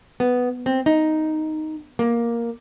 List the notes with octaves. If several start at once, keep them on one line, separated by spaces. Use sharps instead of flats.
B3
C4
D#4
A#3